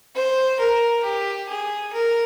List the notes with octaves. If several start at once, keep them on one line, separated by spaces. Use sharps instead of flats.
C5
A#4
G4
G#4
A#4